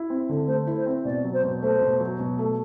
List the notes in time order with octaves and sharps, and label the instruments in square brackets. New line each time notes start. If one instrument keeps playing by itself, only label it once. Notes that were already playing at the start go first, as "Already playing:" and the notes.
Already playing: [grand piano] E4
C4
D3
[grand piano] A3 [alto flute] C5
[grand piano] E4
[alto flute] C5
[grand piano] C4
[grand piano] B2 [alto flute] D5
[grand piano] F#3
[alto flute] C5
[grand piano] B2
[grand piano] A3 [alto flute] C5
[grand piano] B2
F#3
B2
A3